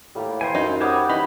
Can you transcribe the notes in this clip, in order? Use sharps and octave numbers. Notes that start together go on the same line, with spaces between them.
A2 G3 A#3 G4
E3 C5 G5 G#5
F#2 D#4
G3 C5 C#5 F#5 D6 D#6
E3 D#4 B5